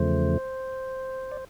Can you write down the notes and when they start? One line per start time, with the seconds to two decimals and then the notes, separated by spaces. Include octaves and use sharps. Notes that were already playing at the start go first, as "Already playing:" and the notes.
Already playing: E2 C#3 F3 A3 C5
1.32 D5